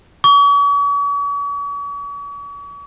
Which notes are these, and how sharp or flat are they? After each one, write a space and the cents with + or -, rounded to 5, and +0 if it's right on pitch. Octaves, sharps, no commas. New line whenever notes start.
C#6 +45